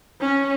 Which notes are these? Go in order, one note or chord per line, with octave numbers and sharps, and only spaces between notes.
C#4